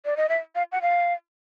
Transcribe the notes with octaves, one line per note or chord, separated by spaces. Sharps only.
D5
D#5
E5
F5
F#5
F5